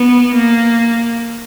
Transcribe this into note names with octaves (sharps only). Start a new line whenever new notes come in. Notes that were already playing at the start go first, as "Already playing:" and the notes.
Already playing: B3
A#3